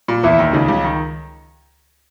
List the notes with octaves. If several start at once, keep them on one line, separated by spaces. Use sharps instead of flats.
A#2
E2 E3 E4
D#2 D#3
C#2 C#3 D#4
C#2 C#3
D#3